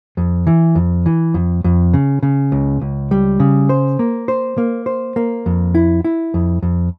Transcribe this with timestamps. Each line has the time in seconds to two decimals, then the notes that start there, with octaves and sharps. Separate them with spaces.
0.17 F2
0.47 E3
0.75 F2
1.06 E3
1.34 F2
1.64 F2
1.93 C#3
2.23 C#3
2.52 C#2
2.81 C#2
3.11 G3
3.40 C#3
3.69 C5
3.99 A#3
4.28 C5
4.58 A#3
4.86 C5
5.16 A#3
5.46 F2
5.75 E4
6.04 E4
6.34 F2
6.62 F2